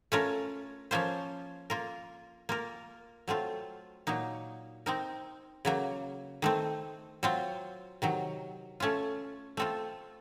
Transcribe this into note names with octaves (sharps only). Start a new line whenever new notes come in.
A3 C#4 F4 A#4
F3 A#3 C#4 F4 C5
A#3 F4 A#4
A#3 F4 A#4
F#3 A3 C4 F4
A#2 F#3 A#3 D#4
C4 D#4 A#4
C#3 F#3 A#3
D#3 A3 C4
F#3 C4 F4
C3 D#3 F#3
A3 C#4 F4
A3 C4 F4 A4